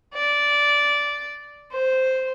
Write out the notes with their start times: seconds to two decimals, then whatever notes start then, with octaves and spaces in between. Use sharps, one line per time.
0.14 D5
1.72 C5